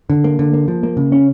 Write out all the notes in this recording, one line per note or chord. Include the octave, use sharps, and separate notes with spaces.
D3
A#3
D3
A#3
F3
A#3
C#3
C#4